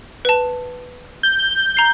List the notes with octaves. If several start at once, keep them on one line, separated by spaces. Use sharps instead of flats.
B4 A5
G6
A#5 C7